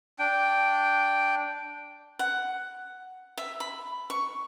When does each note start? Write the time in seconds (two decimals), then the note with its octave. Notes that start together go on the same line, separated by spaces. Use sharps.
0.19 D4 G5
2.19 F#5
3.38 E5
3.60 B5
4.10 C#6